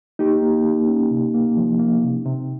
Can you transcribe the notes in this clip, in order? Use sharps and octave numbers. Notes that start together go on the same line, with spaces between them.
A#3 D#4 G4
A#3
A#3
C#4
C3
A#3
F3
A#3
C3
C3